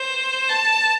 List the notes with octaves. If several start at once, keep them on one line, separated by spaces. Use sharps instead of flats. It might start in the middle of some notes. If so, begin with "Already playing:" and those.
Already playing: C5
A5